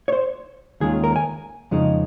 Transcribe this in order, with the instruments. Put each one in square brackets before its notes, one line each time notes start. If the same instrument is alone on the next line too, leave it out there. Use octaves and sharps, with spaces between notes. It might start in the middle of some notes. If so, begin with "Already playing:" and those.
[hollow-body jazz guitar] C#5
C5
D#2 D#3 G#3 C#4 F4 G#4
A#4
G#5
F2 C#3 F3 G#3 D#4